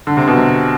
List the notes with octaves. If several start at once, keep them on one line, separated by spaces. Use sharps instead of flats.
D3
C3
B2
C3